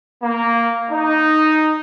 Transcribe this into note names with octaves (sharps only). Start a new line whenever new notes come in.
A#3
D#4